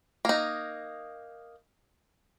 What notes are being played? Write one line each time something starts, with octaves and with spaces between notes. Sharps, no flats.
A#3 D#4